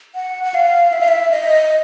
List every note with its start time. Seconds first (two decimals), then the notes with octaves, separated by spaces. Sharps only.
0.15 F#5
0.44 F#5
0.54 F5
0.92 E5
1.01 F5
1.08 E5
1.31 D#5